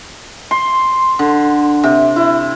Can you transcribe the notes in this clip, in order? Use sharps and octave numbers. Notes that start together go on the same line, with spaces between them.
C6
D3
C3
E4